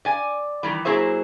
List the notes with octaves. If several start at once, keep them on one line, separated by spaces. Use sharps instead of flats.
D5 G#5
D#3 E3 G3
F#3 A#3 E4 G#4 C5 E5